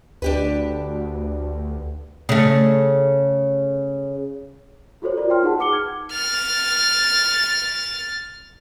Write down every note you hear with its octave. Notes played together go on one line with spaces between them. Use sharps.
D2 D4 G4 B4
C#3 A3
F4 F#4 A4 C5 C#5
F4 F#4 A#4 D5
G5 C6 F6
D#4 F#4 G#4 F#5 A5
B4 F#5 D6 C#7 G7
F6 G#6
F6 A6